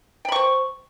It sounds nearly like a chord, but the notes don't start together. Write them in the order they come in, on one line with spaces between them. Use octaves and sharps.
G5 B5 C#6 C5